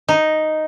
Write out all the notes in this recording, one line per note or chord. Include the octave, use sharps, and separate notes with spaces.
D#4